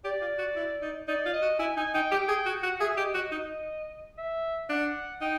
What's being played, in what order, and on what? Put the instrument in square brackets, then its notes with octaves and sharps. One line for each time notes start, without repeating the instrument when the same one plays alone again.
[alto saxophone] G4 [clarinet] D5
[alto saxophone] F4
F#4
E4
D#4
[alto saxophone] D#4 [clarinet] D5
[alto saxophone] F4
[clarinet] D#5
[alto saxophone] F#4
[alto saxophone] E4 [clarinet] G#5
[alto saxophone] D#4 [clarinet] G#5
[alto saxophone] D#4 [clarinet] G5
[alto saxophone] G4
G#4
F#4
[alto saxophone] F#4 [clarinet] F#5
[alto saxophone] G#4 [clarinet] E5
[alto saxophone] G4 [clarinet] D#5
[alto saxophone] F#4 [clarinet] D#5
[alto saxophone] D#4
[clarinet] E5
[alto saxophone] D4 [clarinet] F#5
[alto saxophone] D#4 [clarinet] G5